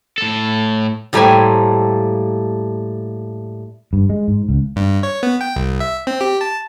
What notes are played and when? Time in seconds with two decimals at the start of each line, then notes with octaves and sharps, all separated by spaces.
0.18 A2 A4
1.13 A2 G3 A3 A#3 C5 G#5
3.93 G2
4.09 G#3
4.28 G#2
4.49 C#2
4.76 G2
5.03 C#5
5.23 B3
5.41 G5
5.56 C2
5.80 E5
6.07 C4
6.21 G4
6.41 A5